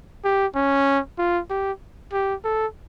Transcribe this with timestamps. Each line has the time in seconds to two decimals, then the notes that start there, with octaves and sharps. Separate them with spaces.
0.24 G4
0.55 C#4
1.18 F4
1.50 G4
2.13 G4
2.44 A4